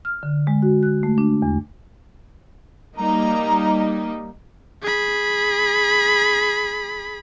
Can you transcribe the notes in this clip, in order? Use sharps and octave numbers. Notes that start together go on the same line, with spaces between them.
F6
D3
G#3
F#4
F#6
A3
D4
E2
G3 A#3 D#4 A#5
G#4 B5